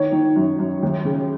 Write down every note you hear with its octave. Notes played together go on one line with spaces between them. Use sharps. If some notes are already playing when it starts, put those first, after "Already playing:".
Already playing: D#3 C#5
D#3
F#2
F#2
D#2
C#3